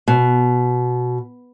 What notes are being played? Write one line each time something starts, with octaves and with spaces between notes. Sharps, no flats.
B2